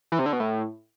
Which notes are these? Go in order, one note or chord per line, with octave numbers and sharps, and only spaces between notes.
E3
C3
D3
B2
A2